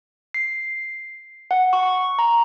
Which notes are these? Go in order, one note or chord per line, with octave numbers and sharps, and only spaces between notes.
C7
F#5
C#6
A#5